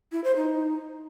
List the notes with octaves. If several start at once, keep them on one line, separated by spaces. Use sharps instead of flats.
E4
C5
D#4